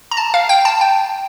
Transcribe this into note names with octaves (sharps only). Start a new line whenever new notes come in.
A#5
A5
F5
G5
A5
G5